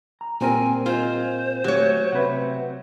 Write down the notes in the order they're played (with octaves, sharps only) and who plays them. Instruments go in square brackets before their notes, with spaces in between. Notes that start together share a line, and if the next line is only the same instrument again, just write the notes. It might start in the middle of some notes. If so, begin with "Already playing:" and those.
[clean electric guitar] A#5
[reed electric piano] A#2 C4 A#4 [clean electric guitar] G3 [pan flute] G#5
[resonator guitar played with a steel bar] F4 [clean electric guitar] G#4 D#5 [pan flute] C5
[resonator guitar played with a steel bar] F#3 C#5 [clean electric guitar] A3 G4
[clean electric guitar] C3 C4 E5 [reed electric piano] B4 F#5